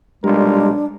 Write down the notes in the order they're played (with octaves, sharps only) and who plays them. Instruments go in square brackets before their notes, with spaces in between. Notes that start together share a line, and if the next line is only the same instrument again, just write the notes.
[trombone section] B1 A#2 A#4 [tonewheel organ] G3 [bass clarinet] G#3 [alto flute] D4